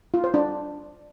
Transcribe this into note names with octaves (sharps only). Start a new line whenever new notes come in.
F4
C5
D4